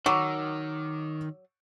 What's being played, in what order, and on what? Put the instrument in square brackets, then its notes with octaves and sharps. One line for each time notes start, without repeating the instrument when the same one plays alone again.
[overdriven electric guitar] D#3 [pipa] F#3 [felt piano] C#6 D6 E6